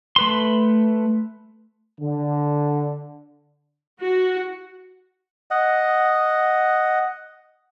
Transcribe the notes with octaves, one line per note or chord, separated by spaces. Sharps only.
A3 B4 C6
D3
F#4
D#5 F#5